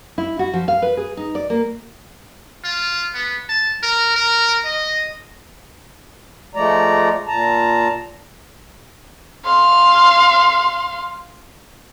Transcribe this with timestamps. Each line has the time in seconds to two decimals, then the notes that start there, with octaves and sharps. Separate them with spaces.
0.18 E4
0.39 F#4
0.53 F3
0.68 F5
0.82 B4
0.97 G#4
1.17 D#4
1.35 D5
1.50 A#3
2.64 F4
3.14 B3
3.49 A5
3.83 A#4
4.16 A#4
4.65 D#5
6.55 F3 G#3 A3 D5 A#5
7.27 A#2 A5 A#5
9.46 F5 C6